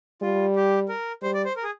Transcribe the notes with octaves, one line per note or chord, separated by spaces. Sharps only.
G3 F4
G4
A#4
G3 C5
D5
C5
A#4
G#4